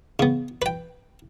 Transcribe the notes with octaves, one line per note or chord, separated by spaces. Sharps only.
C#3 B3
B4 G5